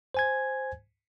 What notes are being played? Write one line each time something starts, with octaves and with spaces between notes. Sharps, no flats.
C5 G#5 G#6